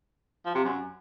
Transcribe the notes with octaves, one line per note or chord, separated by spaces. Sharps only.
F3
C3
F#2